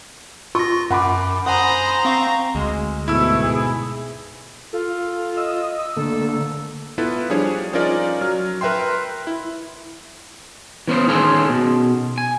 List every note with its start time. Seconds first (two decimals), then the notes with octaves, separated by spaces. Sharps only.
0.55 F4 C#6 A#6
0.91 F#2 F#5 B5 D6
1.46 C5 F#5 G#5 A#5 B5 D#6
2.05 C4 F5 C#6
2.55 D2 G#3
3.08 G#2 B2 A3 E4 E6
3.43 G#4
4.73 F4 A4
5.37 D#5 E6
5.96 D3 A3 A#3 A4
6.98 B3 E4 F4 A4 B4
7.30 F3 G3 D4 G#4 C#5
7.73 F3 C#4 D#4 F4 A#4 D5
8.21 F#3 F6
8.61 A#4 B4 E5 G5 C6
9.27 E4
10.88 E3 B3 C#4 C5
11.08 D#3 C#4 G#4 A4 A#5 C6
11.49 B2
12.18 G#5